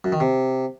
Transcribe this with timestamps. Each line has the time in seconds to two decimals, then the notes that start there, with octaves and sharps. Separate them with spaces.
0.04 F#2
0.12 D#3
0.20 C3